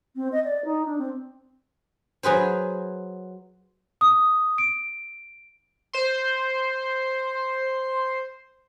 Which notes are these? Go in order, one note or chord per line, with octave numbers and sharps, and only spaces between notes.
C4
D#5
D5
D#4
D4
C4
F#3 G#4 B4 C5
D#6
D7
C5 C6